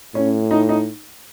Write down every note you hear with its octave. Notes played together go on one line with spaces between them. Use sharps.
A2 C#4
D#4
D#4